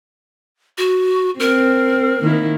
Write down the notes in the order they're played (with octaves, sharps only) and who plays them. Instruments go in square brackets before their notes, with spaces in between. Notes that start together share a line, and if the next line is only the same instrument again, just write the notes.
[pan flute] F#4
[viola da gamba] C4 [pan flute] A#4
[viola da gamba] D#3 A#3 E4